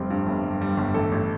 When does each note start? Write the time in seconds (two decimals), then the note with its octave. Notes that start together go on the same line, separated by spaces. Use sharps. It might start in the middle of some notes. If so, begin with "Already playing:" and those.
Already playing: F1 G3 C4
0.10 G2
0.27 G1
0.44 G3
0.61 G3
0.77 G1
0.94 A1 A4
1.12 A1